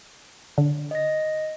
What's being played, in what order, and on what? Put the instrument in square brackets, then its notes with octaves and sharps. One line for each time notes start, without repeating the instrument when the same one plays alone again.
[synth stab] D3
[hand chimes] D#5 A#6